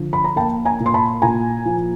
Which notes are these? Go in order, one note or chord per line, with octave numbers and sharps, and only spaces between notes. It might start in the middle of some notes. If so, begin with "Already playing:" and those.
Already playing: D3 F3
B5
A#5
A#3 G5 A5
G#5 A#5
A#2
C6
A5 B5
A#2 G#5 A#5
F3